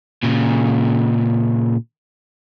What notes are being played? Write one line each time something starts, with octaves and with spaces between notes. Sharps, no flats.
A#2 C#3